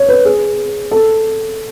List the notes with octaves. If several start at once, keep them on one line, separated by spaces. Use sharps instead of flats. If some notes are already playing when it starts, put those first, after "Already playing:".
Already playing: C#5
B4
G#4
A4